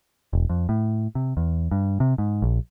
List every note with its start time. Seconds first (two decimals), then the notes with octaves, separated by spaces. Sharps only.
0.33 E1
0.50 F2
0.69 A2
1.15 C3
1.37 E2
1.71 G2
2.00 C3
2.18 G#2
2.42 A#1